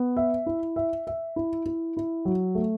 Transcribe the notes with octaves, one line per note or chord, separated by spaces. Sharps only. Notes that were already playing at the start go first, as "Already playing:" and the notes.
Already playing: B3
E5
E4
E5
E5
E4
E4
E4
F#3
A3